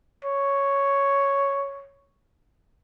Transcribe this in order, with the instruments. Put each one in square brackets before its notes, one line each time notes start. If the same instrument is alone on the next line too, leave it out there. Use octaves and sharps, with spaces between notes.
[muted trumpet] C#5